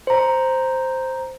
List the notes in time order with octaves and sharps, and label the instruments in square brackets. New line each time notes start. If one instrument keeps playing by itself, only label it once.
[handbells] C5 A#5